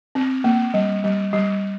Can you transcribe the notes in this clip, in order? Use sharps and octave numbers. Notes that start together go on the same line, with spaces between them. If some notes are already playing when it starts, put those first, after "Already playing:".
C4
A#3
G3
G3
G3